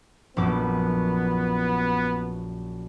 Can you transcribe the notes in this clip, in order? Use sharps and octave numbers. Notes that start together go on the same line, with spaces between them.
A#1 F#2 B3 D6